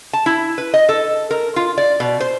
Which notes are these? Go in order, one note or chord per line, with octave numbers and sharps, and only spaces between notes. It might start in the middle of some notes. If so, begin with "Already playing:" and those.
A5
E4
B4
D#5
A4
A#4
F4
D5
B2
C5